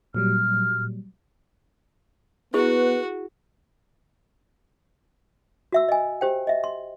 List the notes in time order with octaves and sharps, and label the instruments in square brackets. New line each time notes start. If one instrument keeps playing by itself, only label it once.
[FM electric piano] A#2 F#3 G3 [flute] F6
[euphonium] B3 [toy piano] E4 G#4 [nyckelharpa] F#4 [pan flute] B4
[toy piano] F#4 E5 E6
D#5 G#5
G4 C5 G5
D#5 E5
C6